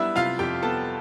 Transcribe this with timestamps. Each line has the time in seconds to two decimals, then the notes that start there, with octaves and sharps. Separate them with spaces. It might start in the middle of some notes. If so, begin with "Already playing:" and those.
Already playing: G3 B3 D4 E4 E5
0.16 C3 F4 F5
0.39 F2 G4 G5
0.62 B3 A4 A5